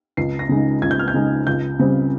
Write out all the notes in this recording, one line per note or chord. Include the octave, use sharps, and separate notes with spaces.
C#2 C7
A#6
C#3 G#3 D#4
C#2 G#6
G6
F6
G6
C#3 G#3 D#4
C#2 G6
C#3 G3 C4